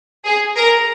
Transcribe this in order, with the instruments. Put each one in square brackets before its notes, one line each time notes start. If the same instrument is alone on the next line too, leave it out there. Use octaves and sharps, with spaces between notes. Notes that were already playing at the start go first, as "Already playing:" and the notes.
[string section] G#4
A#4